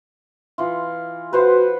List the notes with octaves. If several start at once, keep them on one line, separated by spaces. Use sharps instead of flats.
E3 F4
F#4 B4 C5 F#5